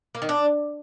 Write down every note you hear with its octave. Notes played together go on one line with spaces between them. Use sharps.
A#3
D#3
D4